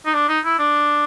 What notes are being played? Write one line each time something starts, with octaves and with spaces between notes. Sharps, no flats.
D#4
D4
D#4
E4
D4